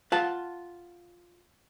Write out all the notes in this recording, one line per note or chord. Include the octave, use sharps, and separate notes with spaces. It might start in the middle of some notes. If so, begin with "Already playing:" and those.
F4 F#5 A5